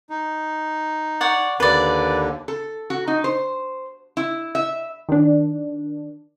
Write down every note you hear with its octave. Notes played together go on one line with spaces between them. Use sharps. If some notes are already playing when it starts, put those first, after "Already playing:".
D#4
C#5 D5 F#5
D#2 D3 B4 D5
A4
F#4
D#4
C5
E4
E5
D#3 D4